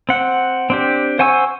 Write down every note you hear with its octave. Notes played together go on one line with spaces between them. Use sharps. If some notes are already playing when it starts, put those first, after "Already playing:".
C4 F#5
C4 D4 G4
C5 F#5 G#5 C#6 E6